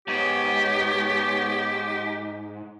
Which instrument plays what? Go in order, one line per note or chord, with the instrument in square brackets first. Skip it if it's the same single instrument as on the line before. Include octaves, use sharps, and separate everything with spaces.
[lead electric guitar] G#2 [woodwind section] B3 C#5 [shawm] G4